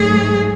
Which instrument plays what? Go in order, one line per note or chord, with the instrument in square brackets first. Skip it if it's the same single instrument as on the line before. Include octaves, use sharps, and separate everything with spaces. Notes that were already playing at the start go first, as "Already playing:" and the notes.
Already playing: [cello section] G#2 F#3 A3 G#4